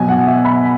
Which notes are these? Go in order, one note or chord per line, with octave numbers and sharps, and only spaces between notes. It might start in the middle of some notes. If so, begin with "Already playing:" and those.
Already playing: B2 F#3 G#5
F#5
E5
B5